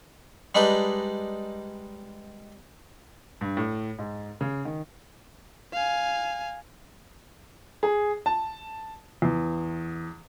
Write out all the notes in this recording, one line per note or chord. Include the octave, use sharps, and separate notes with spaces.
G3 G#3 D4 D#4 B4
G2
A2
G#2
C#3
D#3
F5 G#5
G#4
A5
E2